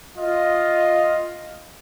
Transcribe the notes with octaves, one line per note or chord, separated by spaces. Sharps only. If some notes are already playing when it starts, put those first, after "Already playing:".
F4 D#5